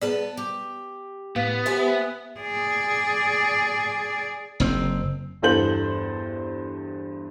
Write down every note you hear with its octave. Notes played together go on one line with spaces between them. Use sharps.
B3 G#4 B4 D5 A5
G4
A2 B3 F5
G4 B4 C5 E5 G5 G#5
G#4 D5
F#1 C4
E2 G2 A4 C5 G6 F#7